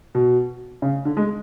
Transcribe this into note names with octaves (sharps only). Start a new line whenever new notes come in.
B2
C#3
D3
G#3